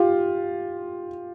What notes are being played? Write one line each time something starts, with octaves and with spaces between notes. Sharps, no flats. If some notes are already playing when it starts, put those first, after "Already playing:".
Already playing: F4 G4